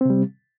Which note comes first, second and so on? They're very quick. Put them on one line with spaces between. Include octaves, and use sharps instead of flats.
C4 C3 G3